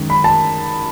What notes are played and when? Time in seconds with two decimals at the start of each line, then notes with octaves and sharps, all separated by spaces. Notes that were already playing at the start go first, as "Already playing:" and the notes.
Already playing: F#2 D#3 G#3
0.10 B5
0.24 A5